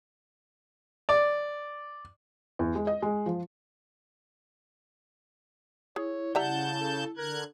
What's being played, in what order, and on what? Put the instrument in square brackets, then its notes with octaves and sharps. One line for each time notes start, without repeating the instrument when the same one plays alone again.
[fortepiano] D5
[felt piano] E2
G#3
D#5
G#3
F3
[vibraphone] E4 [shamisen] G#4 [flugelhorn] C#5
[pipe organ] C#3 A5 G6 [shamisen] G3 E5 A#5 [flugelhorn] F#5
[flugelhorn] A4
[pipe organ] D3 F#6 G#6 [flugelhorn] A#4